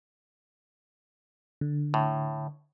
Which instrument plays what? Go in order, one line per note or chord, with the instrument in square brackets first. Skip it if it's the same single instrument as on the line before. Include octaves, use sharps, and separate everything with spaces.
[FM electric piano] D3
[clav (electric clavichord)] A2